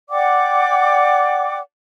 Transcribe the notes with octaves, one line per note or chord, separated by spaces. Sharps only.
D5 F#5 G5 D6